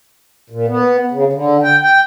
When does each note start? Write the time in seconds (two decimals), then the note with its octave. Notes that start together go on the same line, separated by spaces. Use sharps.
0.50 A#2
0.68 B3
1.11 C#3
1.33 D3
1.63 G5
1.83 G5